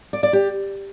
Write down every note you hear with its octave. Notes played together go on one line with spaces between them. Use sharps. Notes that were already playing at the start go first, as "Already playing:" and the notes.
D5
D5
G4